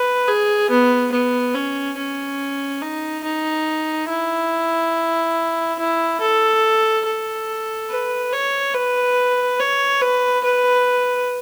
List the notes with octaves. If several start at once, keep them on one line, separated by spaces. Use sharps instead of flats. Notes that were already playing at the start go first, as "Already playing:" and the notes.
Already playing: B4
G#4
B3
B3
C#4
C#4
D#4
D#4
E4
E4
A4
A4
B4
C#5
B4
C#5
B4
B4